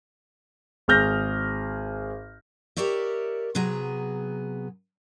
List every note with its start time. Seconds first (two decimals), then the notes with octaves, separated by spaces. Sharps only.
0.88 G#1 G#4 F6 G6 A#6
2.77 G4 A#4 C#5 D5 E5
3.55 C3 F#3 B3 G#4 A#5